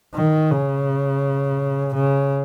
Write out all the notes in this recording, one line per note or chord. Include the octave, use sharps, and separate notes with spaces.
D#3
C#3
C#3